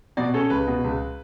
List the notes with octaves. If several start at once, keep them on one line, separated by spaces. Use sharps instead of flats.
B2 D5
C#4 A4
C#2 B4
B2
C#2